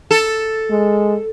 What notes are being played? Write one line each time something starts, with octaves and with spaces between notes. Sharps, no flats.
A4
G#3